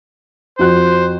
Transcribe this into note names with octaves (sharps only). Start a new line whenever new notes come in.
F2 F#4 C5 F#6